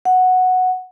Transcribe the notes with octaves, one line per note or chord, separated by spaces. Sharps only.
F#5